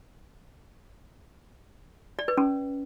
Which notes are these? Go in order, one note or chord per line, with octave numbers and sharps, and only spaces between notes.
D5
B4
C#4